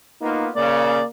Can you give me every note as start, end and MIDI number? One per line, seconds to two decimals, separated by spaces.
0.21 0.49 58
0.21 0.49 59
0.21 0.47 63
0.21 0.49 65
0.56 0.99 49
0.56 1.07 58
0.56 1.03 74